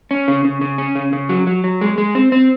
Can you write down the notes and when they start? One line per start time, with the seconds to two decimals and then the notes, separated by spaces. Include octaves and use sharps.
0.11 C#4
0.28 C#3
0.45 C#3
0.61 C#3
0.78 C#4
0.95 C#3
1.13 C#3
1.29 F#3
1.47 F#3
1.64 F#3
1.81 G#3
1.98 G#3
2.15 C4
2.32 C4